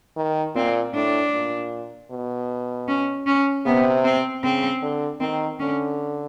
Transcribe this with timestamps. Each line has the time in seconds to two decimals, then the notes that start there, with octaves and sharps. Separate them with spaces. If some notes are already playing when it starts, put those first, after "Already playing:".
0.17 D#3
0.55 A#2 C4
0.94 A2 D4
1.33 A#2
2.11 B2
2.88 C#4
3.27 C#4
3.65 C3 B3
4.05 C4
4.43 C#3 C4
4.82 D3
5.20 D#3 C4
5.59 D3 C#4